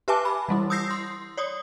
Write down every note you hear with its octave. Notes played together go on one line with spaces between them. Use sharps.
G4 B4 E5 G#5 A5 D6
B5
E3 G3 E4
D#6 E6 G6 A#6 C7
C6
C#5 D5 D#6